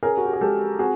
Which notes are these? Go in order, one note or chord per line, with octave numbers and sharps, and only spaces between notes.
C#4 G#4 A#4
F#4
G4
G#4
G#3 G4 A4
C4 F#4 G#4